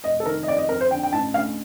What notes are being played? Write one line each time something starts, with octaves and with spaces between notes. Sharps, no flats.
F1 D#5
A4
D#3 A#4
D#5
F2 D5
D#5
F2 A#4
C5
D3 G5
G5
A1 A5
D2 F5